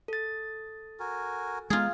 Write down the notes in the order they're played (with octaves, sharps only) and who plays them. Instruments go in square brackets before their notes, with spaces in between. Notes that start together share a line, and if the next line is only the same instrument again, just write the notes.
[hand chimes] A4 A6
[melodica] F#4 A#4 G#5
[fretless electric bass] G#3 B3 [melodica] D#4 [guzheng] F4 G#4